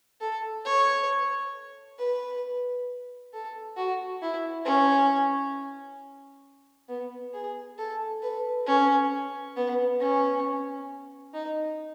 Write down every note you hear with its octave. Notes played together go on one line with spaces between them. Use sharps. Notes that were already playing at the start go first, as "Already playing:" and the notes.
A4
C#5
B4
A4
F#4
E4
C#4
B3
G#4
A4
B4
C#4
B3
C#4
D#4